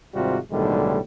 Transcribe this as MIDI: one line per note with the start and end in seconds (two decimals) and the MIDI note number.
0.14 0.38 32
0.14 0.38 44
0.14 0.38 48
0.14 0.38 55
0.14 0.38 65
0.14 0.38 66
0.51 0.98 35
0.51 0.98 45
0.51 0.98 50
0.51 0.98 51
0.51 0.98 55
0.51 0.98 56